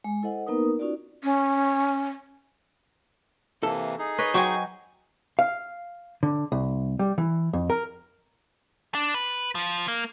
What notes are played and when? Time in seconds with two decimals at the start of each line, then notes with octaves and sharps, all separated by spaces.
0.04 G#3 G#5
0.23 E4 A4 C5 D#5 F#5
0.47 A#3 B3 D#4 A#4 B4 D#6
0.79 C#4 D#4 F4 F#4 D5
1.24 C#4
3.63 C3 E3 A#3 A4
3.99 D#4 G#4
4.18 B4 C#5 D#5
4.34 F#3 C5 G5 G#5 C#6
5.39 F5
6.23 D3
6.52 C2
6.99 G3
7.18 E3
7.53 F2
7.70 A#4
8.95 D4
9.14 B4
9.55 F3
9.88 A#3